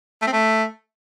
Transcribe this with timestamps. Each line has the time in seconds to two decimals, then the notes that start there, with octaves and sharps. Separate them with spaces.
0.22 A3
0.27 C4
0.32 A3